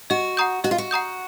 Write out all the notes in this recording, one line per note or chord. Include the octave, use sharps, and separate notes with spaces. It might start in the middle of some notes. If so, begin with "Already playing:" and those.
F#4 D#5
F#5 A#5 D#6 G6
F#4 D#5
F4
F#4
F#5 A#5 D#6 G6